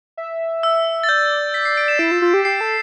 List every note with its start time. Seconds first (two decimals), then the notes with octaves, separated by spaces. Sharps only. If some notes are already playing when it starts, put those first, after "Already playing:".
0.17 E5
0.63 E6
1.04 A6
1.09 D5 G6
1.54 B6
1.65 C7
1.77 D7
1.88 E7
1.99 E4 D7
2.11 F4
2.22 F4
2.34 G4
2.45 G4 C7
2.61 A4